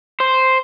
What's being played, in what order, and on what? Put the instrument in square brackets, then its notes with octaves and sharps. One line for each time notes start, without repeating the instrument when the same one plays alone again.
[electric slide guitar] C5